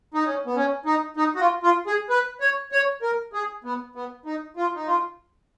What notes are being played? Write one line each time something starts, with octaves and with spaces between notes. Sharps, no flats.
D#4
C#4
B3
C#4
D#4
D#4
F#4
F4
F4
G#4
B4
C#5
C#5
A#4
G#4
B3
B3
D#4
F4
D#4
F4